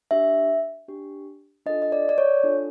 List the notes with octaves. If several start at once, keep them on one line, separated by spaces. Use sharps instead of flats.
D4 G4 E5
D4 G4
D4 F4 A4 D#5
D#5
D5
D5
C#5
D4 F4 A4